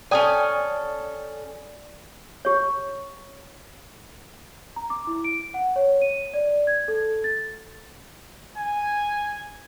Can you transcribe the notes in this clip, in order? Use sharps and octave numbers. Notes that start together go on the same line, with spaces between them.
C#4 A4 D5 G5 G#5 D#6
G4 C#5
A#5
D6
E4
D7
F#5
C#5
D#7
D5
G#6
A4
A6
G#5